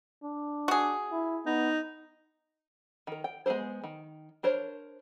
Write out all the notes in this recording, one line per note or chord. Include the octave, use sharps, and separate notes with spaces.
D4
F#4 G#4
E4
B3 D#4
D#3 A#4
G5
G#3 B3 G#4 A#4 C5
D#3
D4 A#4 C5 C#5